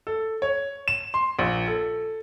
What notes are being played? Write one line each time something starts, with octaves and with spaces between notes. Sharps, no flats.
A4
C#5
E7
C6
A#1
A4